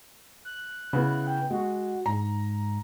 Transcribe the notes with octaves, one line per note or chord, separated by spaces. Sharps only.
F#6
C#3 B3 E4
G5
G#3 F#4
G#2 A#5